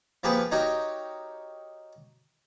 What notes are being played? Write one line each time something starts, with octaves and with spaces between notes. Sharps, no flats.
F3 A#3 B3 G4 G#4 B4
D#4 F#4 G4 A#4 C#5 D#5